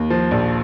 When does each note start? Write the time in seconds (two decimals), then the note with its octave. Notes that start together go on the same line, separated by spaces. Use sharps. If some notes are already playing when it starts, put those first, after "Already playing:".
Already playing: D#2
0.10 F3
0.31 A#1